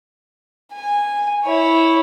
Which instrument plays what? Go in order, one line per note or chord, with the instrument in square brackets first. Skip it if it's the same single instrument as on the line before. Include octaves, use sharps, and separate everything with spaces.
[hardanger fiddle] G#5
E4 C#5